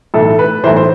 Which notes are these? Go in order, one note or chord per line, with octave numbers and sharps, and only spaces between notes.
B1 A2 E3 A4
B4
B1 A2 E3 C5
C5